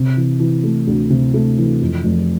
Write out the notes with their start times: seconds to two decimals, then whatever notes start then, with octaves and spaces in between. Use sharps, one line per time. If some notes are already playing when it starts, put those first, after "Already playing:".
Already playing: C3
0.17 E3
0.40 E3
0.64 A3
0.87 D2
1.10 C3
1.34 A3
1.58 E3
1.81 F2
2.04 F1